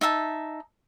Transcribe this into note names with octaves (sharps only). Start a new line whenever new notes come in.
D#4 E5 F#5 A5